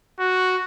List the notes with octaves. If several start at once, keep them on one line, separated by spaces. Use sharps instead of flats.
F#4